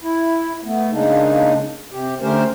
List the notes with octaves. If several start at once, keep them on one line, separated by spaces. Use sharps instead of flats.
E4
A3 B3
C#3 G#3 A#3 D4 D#4
C3 G4
D3 A3 C#4 G4 A#4 C5